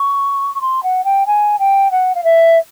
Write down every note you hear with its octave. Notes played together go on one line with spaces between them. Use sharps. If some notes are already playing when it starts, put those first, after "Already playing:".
Already playing: C#6
C#6
C6
F#5
G5
G#5
G5
F#5
F5
E5